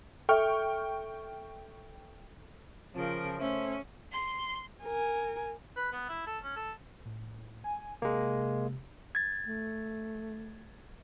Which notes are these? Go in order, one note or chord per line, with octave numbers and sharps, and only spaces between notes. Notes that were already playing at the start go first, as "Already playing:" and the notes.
A4 E5 G5 C#6 F6
C#3 F3 A#4
A3 C#4 C5 E5
C6
A#4 G#5
B4
B3
E4
A4
C#4
A4
A2
G#5
C3 G#3 A#3
G#6 A6
A3